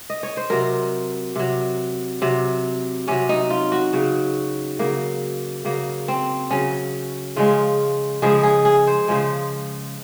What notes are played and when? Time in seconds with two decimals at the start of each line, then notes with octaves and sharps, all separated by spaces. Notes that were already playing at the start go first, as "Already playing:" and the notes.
Already playing: F5
0.10 D#5
0.23 C#5
0.37 C5
0.50 C3 F#3 A#4
1.36 C3 F#3
2.22 C3 F#3
3.08 C3 F#3 C#4
3.29 D#4
3.50 F4
3.72 F#4
3.93 C#3 F#3
4.79 C#3 F#3 A#3
5.65 C#3 F#3 A#3
6.08 C4
6.51 C#3 F#3 C#4
7.36 C#3 F3 G#3 F4
8.22 C#3 F3 G#3 G#4
8.43 G#4
8.65 G#4
8.87 C5
9.08 C#3 F3 G#3